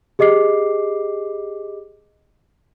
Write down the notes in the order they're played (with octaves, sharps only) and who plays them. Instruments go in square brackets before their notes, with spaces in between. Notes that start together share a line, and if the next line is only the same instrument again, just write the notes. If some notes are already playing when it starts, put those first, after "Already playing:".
[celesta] G4 G#4 D#5 D6 C7